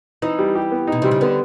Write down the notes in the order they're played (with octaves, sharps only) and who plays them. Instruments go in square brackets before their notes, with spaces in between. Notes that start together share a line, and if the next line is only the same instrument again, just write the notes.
[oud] E3 [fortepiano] D#4
[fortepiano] G3
G4
B3
[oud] B2 [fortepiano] D#4
[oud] C3 [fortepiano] G3
[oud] C#3
[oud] D3 [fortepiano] B3